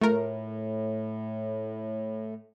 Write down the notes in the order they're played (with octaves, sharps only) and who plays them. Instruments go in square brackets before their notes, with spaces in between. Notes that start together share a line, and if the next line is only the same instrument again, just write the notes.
[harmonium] A2 [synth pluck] A3 F4 A#4